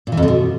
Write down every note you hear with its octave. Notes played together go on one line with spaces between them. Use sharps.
A#2
E3
F2
D3
B2